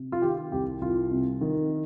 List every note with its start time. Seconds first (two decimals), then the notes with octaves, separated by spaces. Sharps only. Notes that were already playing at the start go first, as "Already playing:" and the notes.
Already playing: C3
0.12 F4
0.22 D#3 G4
0.52 C2 G4
0.81 C2 F4
1.11 C3
1.41 D#3